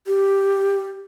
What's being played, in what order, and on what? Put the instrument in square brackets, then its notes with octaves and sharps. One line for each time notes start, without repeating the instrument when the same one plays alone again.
[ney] G4